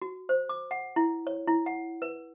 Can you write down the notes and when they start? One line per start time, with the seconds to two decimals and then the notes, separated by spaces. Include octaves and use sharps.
0.02 F#4
0.29 C5
0.49 D6
0.71 F#5
0.96 E4
1.27 C#5
1.48 E4
1.66 F#5
2.02 B4